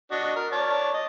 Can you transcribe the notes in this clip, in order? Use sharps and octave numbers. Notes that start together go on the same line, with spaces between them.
D4 F#4 D#5
A#4
C#5 D5 A5
D#5